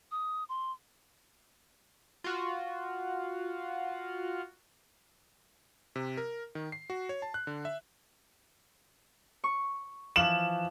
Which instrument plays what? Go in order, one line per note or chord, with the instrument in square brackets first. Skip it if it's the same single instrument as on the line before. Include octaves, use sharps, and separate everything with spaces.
[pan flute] D#6
C6
[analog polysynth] F4 F#4
[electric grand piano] C3
A#4
D#3
C7
F#4
C#5
A5
F#6
D3
E5
[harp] C#6
[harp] E3 F3 [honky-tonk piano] E7 F#7